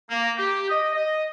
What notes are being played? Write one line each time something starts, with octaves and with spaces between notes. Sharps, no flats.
A#3
G4
D#5
D#5